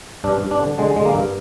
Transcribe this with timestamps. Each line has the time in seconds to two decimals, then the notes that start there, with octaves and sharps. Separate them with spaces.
0.24 G2 D4
0.42 G2
0.51 D4
0.60 D3
0.78 D3 G#3
0.96 D3 G#3
1.06 A#3
1.15 G2